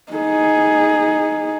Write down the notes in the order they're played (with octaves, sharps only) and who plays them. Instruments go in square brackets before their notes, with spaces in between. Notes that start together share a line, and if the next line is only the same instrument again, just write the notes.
[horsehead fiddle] D#4 G#4